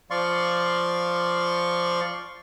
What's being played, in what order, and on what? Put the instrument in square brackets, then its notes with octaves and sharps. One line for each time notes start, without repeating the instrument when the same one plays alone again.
[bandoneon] F3 D5 F5 C6 C#6